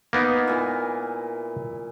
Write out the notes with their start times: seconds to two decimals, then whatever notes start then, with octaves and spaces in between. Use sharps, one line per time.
0.13 A#3 B3 D#4
0.47 A#2 E4 G#5